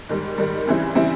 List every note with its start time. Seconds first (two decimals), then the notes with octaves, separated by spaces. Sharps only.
0.09 G#2 D#3 G3
0.38 G#2 D#3 G3
0.67 C#3 E3 G3 C4 E4
0.95 C#3 E3 G3 C4 E4